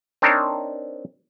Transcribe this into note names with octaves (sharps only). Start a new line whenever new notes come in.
C4 D4 D#4 A#4 C5 C#5